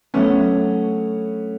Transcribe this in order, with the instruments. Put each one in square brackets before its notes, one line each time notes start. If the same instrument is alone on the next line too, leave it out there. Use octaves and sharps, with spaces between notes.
[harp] F#3 A3 D4 [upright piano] B3 C#4